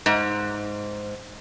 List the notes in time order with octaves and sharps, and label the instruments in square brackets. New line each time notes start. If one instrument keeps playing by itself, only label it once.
[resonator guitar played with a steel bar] G#2